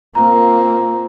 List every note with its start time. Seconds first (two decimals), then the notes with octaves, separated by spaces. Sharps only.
0.15 A#2 A#3 C4 A#5